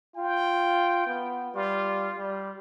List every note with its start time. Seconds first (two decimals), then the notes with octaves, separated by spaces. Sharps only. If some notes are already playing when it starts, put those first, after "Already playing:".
0.16 F4 G5
1.07 B3
1.55 G3 F4
2.18 G3